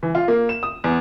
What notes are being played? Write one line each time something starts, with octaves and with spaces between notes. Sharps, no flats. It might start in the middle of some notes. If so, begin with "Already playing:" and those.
E3
F4
A#3
E7
D#6
E2